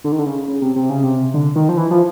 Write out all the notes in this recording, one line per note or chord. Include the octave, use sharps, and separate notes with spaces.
D3
D#3
D3
C#3
C#3
C3
C3
C#3
C3
D3
D#3
F3
E3
F3